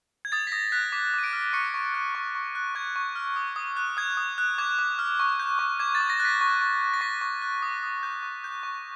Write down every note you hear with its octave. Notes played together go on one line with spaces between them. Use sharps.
G#6
D#6 A6
B6
D#6 A#6
F#6 B6
D6 B6
D6 D#7
D7
F6
C#6 C#7
C#6
F#6
C#6
C#6
F#6
C#6 G#6
C#6
F6
D#6
D#6
F#6
D#6 G#6
D#6
F#6
D6 G#6
D6
F6
C#6
G6
C#6
D6 G#6
A6
D6
A#6
F#6
B6
C#6
C#6
F#6
A#6
C#6 B6
C#6
F#6
D#6
D#6
G6
C#6
G6
C#6